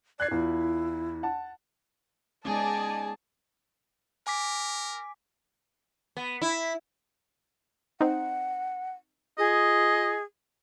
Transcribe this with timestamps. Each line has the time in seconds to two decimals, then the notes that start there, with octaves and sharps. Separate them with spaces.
0.20 D5 F#6 G#6 C7
0.31 E2 E4 F4
1.23 F#5 A5
2.45 G#3 B3 C#4 D#4 G#4 D5 G#5 A5
4.27 A#4 G#5 D6 B6
6.17 B3
6.42 E4
8.01 C4 D#4 F#5
9.38 F4 G#4 D#5